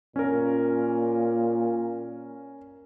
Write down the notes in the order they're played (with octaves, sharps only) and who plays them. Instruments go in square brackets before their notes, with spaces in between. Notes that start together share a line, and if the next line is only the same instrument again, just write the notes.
[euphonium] A#2 [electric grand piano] C#4 A#4